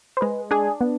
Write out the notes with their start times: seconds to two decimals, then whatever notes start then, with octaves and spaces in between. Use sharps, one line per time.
0.17 C5
0.21 G#3 B4
0.51 D4 G#4 G#5
0.81 B3